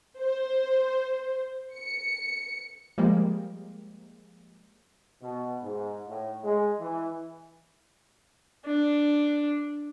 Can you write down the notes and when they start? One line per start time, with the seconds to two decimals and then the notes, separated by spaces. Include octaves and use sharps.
0.18 C5
1.75 C#7
2.98 F3 G3 G#3 A#3
5.22 B2
5.63 G#2
6.09 A2
6.44 G#3
6.80 E3
8.66 D4